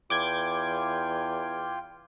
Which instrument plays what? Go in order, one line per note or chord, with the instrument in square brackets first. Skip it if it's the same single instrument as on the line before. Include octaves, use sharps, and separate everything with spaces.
[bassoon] E2 [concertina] F4 G5 [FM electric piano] D6 G6 G#6